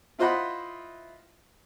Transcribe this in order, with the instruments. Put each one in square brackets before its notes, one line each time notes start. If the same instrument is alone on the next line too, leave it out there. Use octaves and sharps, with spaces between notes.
[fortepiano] E4 F4 C5 D#5 F#5 B5